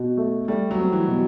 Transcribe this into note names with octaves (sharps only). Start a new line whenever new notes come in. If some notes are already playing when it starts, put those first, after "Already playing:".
Already playing: B2
A3
G3 A3
F#3
C4
E3
B2